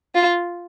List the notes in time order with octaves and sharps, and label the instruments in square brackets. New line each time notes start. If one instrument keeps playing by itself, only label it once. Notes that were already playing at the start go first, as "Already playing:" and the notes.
[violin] F4